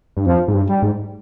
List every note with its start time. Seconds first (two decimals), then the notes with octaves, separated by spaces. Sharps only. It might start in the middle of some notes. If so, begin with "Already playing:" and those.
0.17 G2
0.26 F2 F3
0.48 G#2
0.54 G2
0.68 G3
0.82 G#2